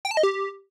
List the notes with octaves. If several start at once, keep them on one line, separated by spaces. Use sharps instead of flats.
G5
A5
D#5
G4